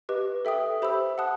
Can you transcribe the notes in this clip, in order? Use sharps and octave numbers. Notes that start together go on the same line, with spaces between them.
G4 B4 D#5
A4 E5 G5 D#6
G4 C5 E5 B5 E6
F#5 A5 D#6 F#6